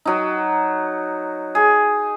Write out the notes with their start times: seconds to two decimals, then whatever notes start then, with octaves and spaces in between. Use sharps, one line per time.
0.05 F#3 D#4
1.55 G#4